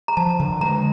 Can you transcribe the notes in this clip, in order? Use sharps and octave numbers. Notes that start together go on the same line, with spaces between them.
A#5
F3 A5
D3
G#3 A#5